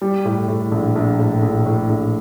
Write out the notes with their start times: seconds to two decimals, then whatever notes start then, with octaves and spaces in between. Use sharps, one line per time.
0.02 G3
0.25 A2
0.48 A2
0.71 A#1
0.96 A#1
1.19 A2
1.42 A#1
1.66 A2
1.89 A#1